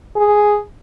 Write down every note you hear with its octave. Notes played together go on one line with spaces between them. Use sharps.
G#4